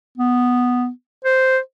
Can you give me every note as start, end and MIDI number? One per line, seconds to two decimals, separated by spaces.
0.18 0.89 59
1.25 1.59 72